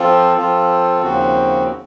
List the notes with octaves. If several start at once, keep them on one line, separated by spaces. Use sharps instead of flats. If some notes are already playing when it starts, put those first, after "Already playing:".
Already playing: F3 C4 F4 A4
F3 C4 F4 A4
D#2 C#3 F3 C4 F#4